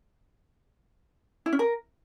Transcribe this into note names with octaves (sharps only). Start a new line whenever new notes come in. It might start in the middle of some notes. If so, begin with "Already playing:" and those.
E4
C#4
A#4